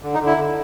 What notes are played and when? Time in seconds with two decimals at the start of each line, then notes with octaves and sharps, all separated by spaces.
0.03 D3
0.14 D#4
0.20 D3
0.26 E4
0.37 D3